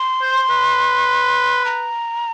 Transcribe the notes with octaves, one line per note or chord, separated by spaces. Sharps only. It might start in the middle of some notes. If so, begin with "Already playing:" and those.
Already playing: C6
C5
B4
A#5